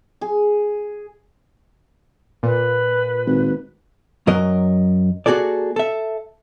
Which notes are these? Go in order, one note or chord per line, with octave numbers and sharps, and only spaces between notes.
G#4
A#2 B4
G#1
F#2 F#3 A#4 D#5
A#3 F#4 G#4 A4 D5
A4 E5